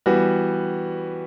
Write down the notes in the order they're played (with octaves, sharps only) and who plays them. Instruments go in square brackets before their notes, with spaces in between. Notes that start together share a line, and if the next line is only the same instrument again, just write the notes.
[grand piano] E3 G3 B3 F#4